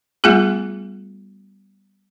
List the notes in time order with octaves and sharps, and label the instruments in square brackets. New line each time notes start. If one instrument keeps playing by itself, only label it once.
[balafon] G3 A3 B3 F4 G#4